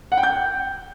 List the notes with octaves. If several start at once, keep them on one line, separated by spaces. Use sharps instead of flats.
F#5
G5
G6